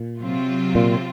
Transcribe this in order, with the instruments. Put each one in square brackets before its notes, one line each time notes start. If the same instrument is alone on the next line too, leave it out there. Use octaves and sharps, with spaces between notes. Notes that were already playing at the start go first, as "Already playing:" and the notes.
Already playing: [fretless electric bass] A#2
[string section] C3 F#3 C4 F4
[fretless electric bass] A#2